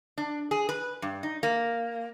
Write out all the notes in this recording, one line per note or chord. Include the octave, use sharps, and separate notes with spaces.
D4
G#4
B4
G2
D#4
A#3